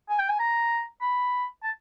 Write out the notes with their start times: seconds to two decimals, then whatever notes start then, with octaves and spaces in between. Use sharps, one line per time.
0.09 G#5
0.19 G5
0.29 G#5
0.39 A#5
1.01 B5
1.63 A5